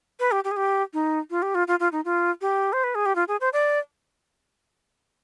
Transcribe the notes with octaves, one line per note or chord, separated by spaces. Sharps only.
B4
G4
G4
G#4
G4
D#4
F4
G4
F4
F4
F4
D#4
F4
G4
C5
B4
G#4
G4
F4
G#4
C5
D5